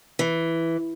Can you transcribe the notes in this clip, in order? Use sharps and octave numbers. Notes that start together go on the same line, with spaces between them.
E3